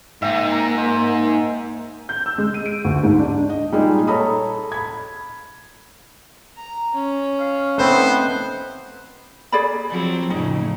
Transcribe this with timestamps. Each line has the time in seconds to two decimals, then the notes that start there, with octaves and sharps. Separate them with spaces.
0.22 G#2 A#3 D#4 E5 G5
0.52 A#5
0.74 C5 A#5
2.09 G6
2.26 E6
2.38 G#3
2.54 D#7
2.66 D7
2.85 D2
3.03 G#2
3.19 D4
3.50 D#5
3.72 A#2 G3 G#3 D#4 G#4
4.07 A4 C#5 A#5 B5 D#6
4.72 B5 G#6
6.56 A#5
6.95 C#4
7.39 F5
7.78 A3 B3 C4 D#4 B4 C5
9.52 G#4 D5 B5
9.90 F3 F#3 C4
10.30 F2 A2 C#3 D#4